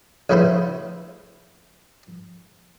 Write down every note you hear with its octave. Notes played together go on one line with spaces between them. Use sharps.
A#1 C#3 A3 B3 E4 C5